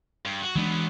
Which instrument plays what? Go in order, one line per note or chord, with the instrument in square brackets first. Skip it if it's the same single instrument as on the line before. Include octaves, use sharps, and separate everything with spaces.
[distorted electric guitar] G2
F#4
[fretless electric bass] E3 G#3 D4 [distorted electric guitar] F#3 B3